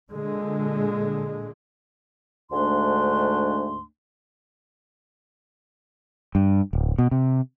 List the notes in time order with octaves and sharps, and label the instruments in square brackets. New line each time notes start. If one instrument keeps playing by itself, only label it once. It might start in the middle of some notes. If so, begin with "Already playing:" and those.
[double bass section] A#2 D3 G#3
[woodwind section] D2 G#2 G#3 A3 D4 C6
[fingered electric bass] G2
D1
B2
C3